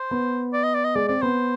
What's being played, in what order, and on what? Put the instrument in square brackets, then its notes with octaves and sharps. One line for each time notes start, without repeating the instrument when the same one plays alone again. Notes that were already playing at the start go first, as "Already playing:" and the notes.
Already playing: [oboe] C5
[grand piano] B3
[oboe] D5
D#5
D5
D#5
[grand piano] G#3 [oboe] D5
[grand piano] C4 [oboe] D5
[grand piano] B3 [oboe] C5